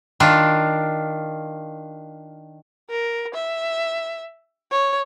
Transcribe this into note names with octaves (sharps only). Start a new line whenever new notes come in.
D#3 D4 F4
A#4
E5
C#5